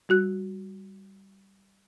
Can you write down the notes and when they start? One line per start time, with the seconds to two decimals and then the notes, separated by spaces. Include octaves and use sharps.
0.09 G3 F#4 F#6